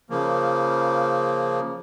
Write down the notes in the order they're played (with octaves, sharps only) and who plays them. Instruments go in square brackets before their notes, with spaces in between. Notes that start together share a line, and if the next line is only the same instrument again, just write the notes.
[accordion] C#3 F3 A#3